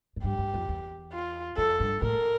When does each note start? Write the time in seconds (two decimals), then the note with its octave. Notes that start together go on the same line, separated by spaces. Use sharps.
0.16 A2
0.24 G2 G4
0.38 G2
0.54 F2
0.69 E2
1.13 F4
1.57 F2 A4
1.80 G2
2.02 A2 A#4